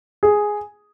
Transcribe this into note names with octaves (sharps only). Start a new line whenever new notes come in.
G#4